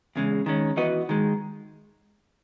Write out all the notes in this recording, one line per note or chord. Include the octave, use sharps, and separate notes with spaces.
E2 C#3 G#3
D#3 G#3 C#4
E3 B3 F#4 B4 D#5
D#3 G#3